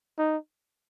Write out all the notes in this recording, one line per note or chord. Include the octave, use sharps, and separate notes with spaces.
D#4